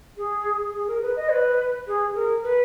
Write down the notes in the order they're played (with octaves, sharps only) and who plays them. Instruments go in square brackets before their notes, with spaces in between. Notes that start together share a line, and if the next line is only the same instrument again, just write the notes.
[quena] G#4
G#4
A#4
B4
D#5
B4
G#4
A#4
B4